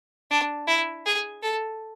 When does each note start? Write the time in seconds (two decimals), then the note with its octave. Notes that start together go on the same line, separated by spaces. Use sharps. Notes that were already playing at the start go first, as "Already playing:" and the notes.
0.31 D4
0.67 E4
1.06 G#4
1.42 A4